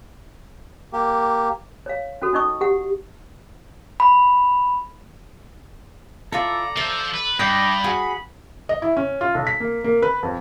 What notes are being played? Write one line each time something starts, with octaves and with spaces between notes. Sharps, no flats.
A#3 G4
C#5 F5
C#4 F#4 A4
C#4 D#4 D#5 C#6 D#6
G4 F#5
B5
E4 F4 A4 D5 E5 A#5
F3 C5 E5
B4
G2 D5 D#5 G5 B5
F#4 G#4
D#5
E4
C#4
F4
B1
B6
A#3
A#3
B4
F2